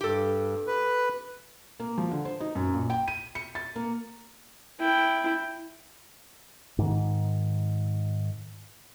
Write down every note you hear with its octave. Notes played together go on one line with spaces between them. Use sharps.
G2 G4 A4
B4
A#3
F3
D3
C5
D#4
F#2
A#1
G5
D#7
C#7
A6
A#3
E4 G5
G#2 D#3